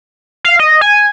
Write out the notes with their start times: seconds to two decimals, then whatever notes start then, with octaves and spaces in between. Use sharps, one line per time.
0.45 F5
0.59 D#5
0.81 G#5